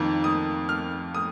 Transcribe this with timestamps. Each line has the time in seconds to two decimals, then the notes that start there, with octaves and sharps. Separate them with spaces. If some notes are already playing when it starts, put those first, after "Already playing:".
Already playing: F2 D#3 A#3
0.24 D#6
0.69 F6
1.15 D#6